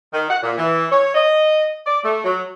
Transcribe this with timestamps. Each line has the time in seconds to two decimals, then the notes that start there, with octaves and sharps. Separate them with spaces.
0.13 D#3
0.30 F#5
0.43 A#2
0.58 E3
0.92 C#5
1.15 D#5
1.86 D5
2.04 A3
2.25 F#3